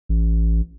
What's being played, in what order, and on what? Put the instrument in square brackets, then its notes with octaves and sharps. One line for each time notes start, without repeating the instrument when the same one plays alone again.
[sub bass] A1